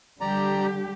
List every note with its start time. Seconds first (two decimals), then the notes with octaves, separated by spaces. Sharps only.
0.21 D3 G3 G4 D5 A#5